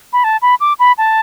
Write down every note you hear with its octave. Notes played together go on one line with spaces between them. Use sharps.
B5
A5
B5
D6
B5
A5